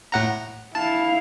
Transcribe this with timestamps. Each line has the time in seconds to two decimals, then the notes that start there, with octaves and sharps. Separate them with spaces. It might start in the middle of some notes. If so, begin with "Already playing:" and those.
0.12 A2 F#5 A#5
0.75 E4 F5 A5